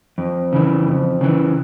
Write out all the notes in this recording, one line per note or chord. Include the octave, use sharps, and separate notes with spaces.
F2
C#3 E3
F2
C#3 E3